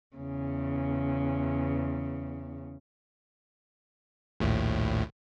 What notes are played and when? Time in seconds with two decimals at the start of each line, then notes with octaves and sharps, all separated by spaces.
0.16 E2 C#3
4.40 A#1 D#2 A2